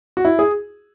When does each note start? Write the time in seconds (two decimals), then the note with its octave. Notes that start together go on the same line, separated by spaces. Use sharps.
0.17 F#4
0.25 E4
0.39 G#4